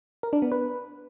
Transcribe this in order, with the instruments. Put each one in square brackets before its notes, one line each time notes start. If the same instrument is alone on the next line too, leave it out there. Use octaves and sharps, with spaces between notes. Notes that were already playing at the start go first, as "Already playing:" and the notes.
[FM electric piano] A#4
D4
B3
B4